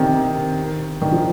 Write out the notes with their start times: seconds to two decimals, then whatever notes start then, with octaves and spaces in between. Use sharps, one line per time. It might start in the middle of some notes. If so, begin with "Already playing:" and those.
Already playing: C3 D#3
1.02 D#3
1.12 F3